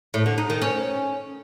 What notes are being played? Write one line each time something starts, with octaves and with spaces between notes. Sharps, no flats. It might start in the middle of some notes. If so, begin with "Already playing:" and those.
A2
D3
D#4
D#3
C#4